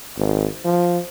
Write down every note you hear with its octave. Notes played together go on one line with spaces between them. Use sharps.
G#1
F3